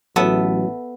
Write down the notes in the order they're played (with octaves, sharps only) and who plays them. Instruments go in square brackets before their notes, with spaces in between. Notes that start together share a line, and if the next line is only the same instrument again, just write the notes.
[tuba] A1 [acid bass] F#3 [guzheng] B3 A4 E5